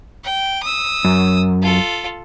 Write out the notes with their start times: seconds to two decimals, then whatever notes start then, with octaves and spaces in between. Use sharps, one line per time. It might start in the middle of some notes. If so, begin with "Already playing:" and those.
0.24 G5
0.63 D#6 E6
1.05 F#2
1.62 F4 A4